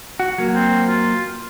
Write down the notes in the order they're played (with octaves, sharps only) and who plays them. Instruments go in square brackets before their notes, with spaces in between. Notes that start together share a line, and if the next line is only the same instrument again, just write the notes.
[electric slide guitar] F#4
F#3 A#3
[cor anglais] C4
F4